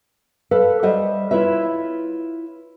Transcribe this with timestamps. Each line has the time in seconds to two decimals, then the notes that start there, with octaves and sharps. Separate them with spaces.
0.51 A4 B4 F5
0.83 G3 C5 D#5 E5 F#5
1.31 E4 F4 B4 C#5 E5